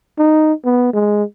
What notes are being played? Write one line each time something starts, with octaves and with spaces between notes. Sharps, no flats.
D#4
B3
G#3